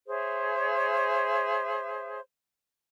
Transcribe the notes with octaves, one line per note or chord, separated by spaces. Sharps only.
G#4 C5 C#5 E5